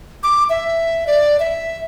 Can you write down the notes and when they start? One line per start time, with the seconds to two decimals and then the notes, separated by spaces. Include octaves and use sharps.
0.23 D6
0.50 E5
1.07 D5
1.40 E5